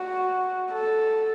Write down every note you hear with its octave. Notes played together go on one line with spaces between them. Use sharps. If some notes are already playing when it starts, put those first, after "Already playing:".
Already playing: F#4
A4